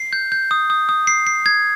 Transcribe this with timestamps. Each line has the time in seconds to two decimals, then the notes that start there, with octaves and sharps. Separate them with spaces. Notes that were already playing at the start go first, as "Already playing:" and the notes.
Already playing: C7
0.13 G6
0.32 G6
0.51 D#6
0.70 D#6
0.89 D#6
1.07 C7
1.27 C7
1.46 G#6